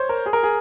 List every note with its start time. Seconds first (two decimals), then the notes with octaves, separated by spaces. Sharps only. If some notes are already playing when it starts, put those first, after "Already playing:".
Already playing: C5 C#5
0.09 A#4
0.26 G#4
0.33 A#4
0.43 G#4